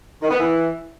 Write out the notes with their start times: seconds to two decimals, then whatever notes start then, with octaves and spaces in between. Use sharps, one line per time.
0.22 D#3
0.31 B3
0.40 E3